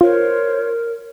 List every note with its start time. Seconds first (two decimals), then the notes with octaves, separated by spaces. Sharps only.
0.01 F4 A#4 C5 C#5